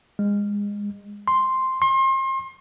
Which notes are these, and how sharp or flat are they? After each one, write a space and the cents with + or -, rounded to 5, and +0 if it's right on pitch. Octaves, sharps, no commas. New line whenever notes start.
G#3 -25
C6 +0
C6 +35